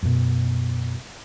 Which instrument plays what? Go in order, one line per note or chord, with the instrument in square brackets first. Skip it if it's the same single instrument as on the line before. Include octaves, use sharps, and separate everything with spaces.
[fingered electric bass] F#2 B2